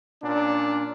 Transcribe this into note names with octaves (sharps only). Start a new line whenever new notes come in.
A#2 C#4 D4